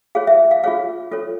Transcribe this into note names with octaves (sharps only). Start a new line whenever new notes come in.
F4 G#4 C#5 F5
E5
F5
F4 G#4 C#5 F5
F4 A4 C#5